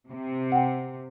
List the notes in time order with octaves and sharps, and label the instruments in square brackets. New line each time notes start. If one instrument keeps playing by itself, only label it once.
[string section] C3
[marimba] F#5 G5